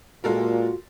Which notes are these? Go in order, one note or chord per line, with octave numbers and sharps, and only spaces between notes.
A#2 G#3 F4 F#4 A4 A#4